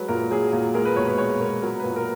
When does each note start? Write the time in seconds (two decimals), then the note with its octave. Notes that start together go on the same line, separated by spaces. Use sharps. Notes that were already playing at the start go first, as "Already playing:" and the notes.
Already playing: F#3 G#3 B4
0.08 A#2 A#4
0.31 F#3 G#4
0.53 A#2
0.74 G#3 A#4
0.85 B4
0.96 B2 C#5
1.07 B4
1.18 G#3 C#5
1.40 B2 A#4
1.62 F#3 A#4
1.80 B4
1.83 A#2 A#4
1.96 A#4